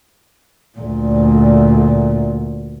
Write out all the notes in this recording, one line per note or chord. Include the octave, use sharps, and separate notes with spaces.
D2 A#2